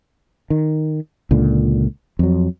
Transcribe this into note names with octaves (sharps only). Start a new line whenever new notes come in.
D#3
C#2 A#2 D3
F2 F#3